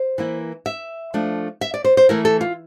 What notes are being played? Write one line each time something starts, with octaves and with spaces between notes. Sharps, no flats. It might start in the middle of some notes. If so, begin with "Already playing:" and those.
Already playing: C5
E3 A#3 E4
E5
F3 A3 D4
E5
D5
C5
C5
E3 A3 E4 A#4
A4
F4